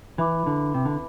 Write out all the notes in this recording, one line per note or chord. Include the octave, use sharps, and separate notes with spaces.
E3 E4 B4 E5 B5 D6
D3
C3
D3